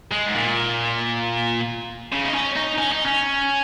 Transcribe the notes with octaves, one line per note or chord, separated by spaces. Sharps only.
G#3
G#2
A#2
C#3
D#4
C#4
D#4
C#4
D#4
C#4